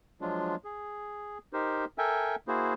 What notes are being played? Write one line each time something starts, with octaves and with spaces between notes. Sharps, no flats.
F3 F#3 G#3 D4 F4
G#4
D#4 G4 A#4 C5
A4 A#4 E5 G5 G#5
A#3 E4 F#4 G#4 C5